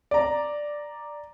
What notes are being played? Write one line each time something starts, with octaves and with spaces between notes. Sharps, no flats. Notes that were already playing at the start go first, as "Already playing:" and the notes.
D5 A#5